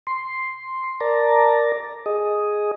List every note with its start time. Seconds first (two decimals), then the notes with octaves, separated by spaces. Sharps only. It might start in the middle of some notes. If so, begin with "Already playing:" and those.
0.07 C6
1.01 A#4 D5 A5 A#5
2.06 G#4 D#5